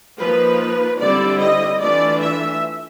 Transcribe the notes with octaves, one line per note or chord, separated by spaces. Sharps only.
F3 A#3 D#4 B4
D3 G3 C4 E4 D5
D#5
E3 A3 D4 F4 D5
E5